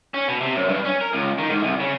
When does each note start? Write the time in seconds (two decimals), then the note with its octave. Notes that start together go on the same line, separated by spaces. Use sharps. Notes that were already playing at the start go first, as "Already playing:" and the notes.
0.14 C#4
0.28 B2
0.41 C3
0.56 F#2
0.69 G2
0.85 C#4
1.01 A#4
1.13 C#2
1.38 D#3
1.50 G#2
1.63 C2
1.80 C#3